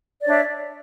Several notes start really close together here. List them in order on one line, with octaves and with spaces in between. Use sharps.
D5 C#5 D4 E5